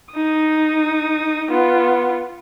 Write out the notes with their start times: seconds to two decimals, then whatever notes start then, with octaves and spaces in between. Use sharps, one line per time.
0.13 D#4 D#6
1.51 B3 F4